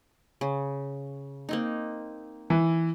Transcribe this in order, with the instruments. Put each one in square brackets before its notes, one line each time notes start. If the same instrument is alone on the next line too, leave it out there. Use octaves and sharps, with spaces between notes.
[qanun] C#3
A#3 C4 D#4
[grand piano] E3